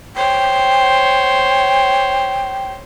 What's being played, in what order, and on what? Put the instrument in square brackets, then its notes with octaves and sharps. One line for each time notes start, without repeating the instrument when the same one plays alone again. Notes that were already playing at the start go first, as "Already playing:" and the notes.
[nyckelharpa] C5 C#5 [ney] G5